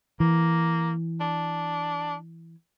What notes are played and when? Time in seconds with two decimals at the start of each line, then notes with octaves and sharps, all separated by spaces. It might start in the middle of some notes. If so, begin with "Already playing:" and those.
0.20 E3 A#3
1.20 D4